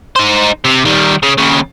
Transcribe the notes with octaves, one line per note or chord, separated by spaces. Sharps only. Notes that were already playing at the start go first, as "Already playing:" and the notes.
D#4 C5
C3
D#3 G3
C#3
D#2 C#3